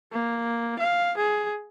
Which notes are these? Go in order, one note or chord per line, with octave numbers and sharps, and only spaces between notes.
A#3
F5
G#4